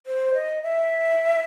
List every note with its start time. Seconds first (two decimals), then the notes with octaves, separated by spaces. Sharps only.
0.06 C5
0.34 D#5
0.63 E5